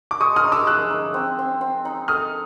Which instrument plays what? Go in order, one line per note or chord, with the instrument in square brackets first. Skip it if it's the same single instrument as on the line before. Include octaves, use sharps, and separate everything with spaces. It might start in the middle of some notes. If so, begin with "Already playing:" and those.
[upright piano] D6
[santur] G#3 [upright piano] C#6 D#6
[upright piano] D#6 F6
[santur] D#4
[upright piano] D6 E6
[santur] G#4 [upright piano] E6 F#6
[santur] D#4
C4
C4
C4
D#4
[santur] A4 [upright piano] D#6 F6